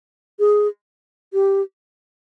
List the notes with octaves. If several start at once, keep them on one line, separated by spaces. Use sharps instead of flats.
G#4
G4